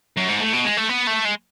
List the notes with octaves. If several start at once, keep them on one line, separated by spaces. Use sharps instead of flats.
F#2
G#2
A2
B2
G#3
A3
B3
A3
G#3